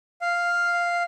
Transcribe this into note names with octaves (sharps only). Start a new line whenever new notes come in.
F5